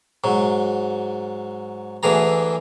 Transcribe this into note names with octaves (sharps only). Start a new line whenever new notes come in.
G#2 F#3
D2 D3 E3 G#4 A#5